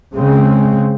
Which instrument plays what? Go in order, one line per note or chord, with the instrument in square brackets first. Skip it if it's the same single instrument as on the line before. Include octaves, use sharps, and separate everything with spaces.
[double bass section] C#3 G#3 C4